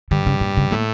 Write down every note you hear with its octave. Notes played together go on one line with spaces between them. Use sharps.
G2 D3
C#3
A#2
C#3
A2 A#3